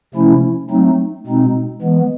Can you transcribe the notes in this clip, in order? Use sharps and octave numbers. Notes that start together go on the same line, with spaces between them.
C3 F3 A3 C#4 E4
F#3 A3 C4 D#4
B2 G#3 C4 D#4
E3 G#3 B3